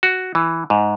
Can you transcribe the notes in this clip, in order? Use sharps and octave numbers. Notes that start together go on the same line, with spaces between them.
F#4
E3
G#2